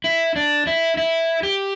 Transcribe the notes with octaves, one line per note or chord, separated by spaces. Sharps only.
E4
D4
E4
E4
G4